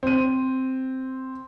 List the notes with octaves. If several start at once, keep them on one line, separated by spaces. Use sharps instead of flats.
C4 D#7